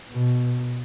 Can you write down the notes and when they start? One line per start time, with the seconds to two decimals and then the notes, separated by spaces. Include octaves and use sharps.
0.11 B2